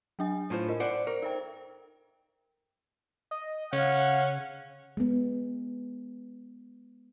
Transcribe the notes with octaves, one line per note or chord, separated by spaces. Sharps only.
F#3 D4 G#5
A2 F4 C5
A#4 D#5
C5 D5 F#5
A#4 C5
D#4 A4 G5
D#5
C#3 C#4 F5 F#5
G#3 B3